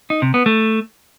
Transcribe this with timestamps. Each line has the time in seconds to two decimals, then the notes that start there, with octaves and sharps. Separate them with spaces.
0.10 D#4
0.22 C3
0.34 B3
0.46 A3